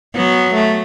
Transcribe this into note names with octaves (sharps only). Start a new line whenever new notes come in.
F#3 B3
A3